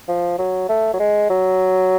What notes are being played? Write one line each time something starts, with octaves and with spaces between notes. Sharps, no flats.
F3
F#3
A3
F#3
G#3
F#3